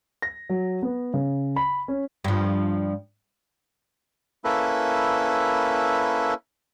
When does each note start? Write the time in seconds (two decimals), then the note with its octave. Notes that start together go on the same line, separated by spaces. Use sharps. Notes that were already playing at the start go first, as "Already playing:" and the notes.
0.22 A#6
0.49 F#3
0.82 B3
1.14 C#3
1.56 B5
1.88 C#4
2.24 G2 F3
4.44 A#3 C#4 E4 A4 B4